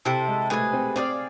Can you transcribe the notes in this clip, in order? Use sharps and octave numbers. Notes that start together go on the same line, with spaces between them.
C3 C4 E4 A4
G#3
A3 G#4 B4 F5 G#5
C4
C4 G#4 D5 F5